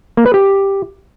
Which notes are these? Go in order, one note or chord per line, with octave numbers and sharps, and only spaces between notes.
A#3
B4
G4